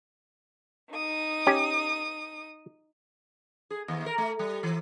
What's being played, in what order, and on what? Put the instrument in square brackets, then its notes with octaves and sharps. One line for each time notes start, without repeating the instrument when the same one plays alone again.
[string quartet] D#4 D#6
[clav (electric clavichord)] C#4 G4
[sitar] G#4
D#2
A#4
A3
G3
E3